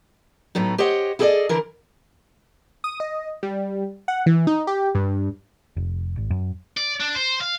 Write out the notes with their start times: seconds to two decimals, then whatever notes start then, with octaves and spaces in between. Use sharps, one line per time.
0.55 A2 F#3 B3 D#4
0.78 G4 C5 C#5 D#5 F#5
1.19 E4 G#4 A4 B4 D5 D#5
1.49 D3 E3 E4 A#4
2.84 D#6
3.00 D#5
3.43 G3
4.08 F#5
4.26 E3
4.47 D#4
4.67 G4
4.95 G2
5.76 F1
6.17 G#1
6.30 F#2
6.77 D5
7.00 D4
7.15 C5
7.41 F5